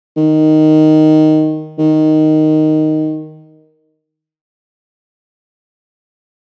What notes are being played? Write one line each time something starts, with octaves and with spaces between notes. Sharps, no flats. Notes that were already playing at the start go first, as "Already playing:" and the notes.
D#3
D#3